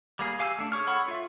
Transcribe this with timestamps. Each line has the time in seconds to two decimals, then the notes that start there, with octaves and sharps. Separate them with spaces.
0.19 G3 A#3 G#4
0.39 G4 F5 G#5 D6 E6
0.58 A3 D4
0.72 G#4 C#5 C#6 F6
0.87 A4 C#5 F#5 B5 C#6
1.08 F4 E5